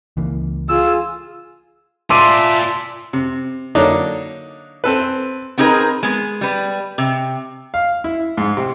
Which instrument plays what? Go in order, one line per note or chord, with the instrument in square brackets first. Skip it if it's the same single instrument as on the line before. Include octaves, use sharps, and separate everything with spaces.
[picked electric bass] C#2 E3 A#3
[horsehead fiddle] F4 G#4 [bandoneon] E6
[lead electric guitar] F4 D5 [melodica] E5 A5 [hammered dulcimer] C6 [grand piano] D6 D7 D#7
[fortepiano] C3
D3 F#3 A#3 D4 D#4
C4 A4 B4
[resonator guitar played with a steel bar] B3 C4 D#4 G#4 A#4 B4
G#3 B3
G3 B4
C3
[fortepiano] F5
E4
G#2
C3